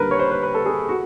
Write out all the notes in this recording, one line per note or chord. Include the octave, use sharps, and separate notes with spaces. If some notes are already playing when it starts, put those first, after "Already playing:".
Already playing: D#2 D3 G3 A#3 A#4 B4
C#5
C5
B4
B4
A4
G#4
F#4